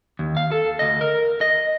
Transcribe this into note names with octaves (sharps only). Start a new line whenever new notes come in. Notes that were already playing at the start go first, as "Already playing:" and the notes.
D#2
F5
A4
D2 D#5
A#4
D#5